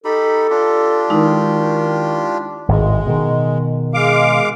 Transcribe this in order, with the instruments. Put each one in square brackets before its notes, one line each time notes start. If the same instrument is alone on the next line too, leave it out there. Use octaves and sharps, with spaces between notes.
[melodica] D#4 G4 B5 [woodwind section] A4
[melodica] D4 F4 G4
[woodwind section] D#3 [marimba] G#3 D#4 E4
[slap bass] G#1 A2 [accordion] G#3
[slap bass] B2 D#3
[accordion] G#3 F5 D6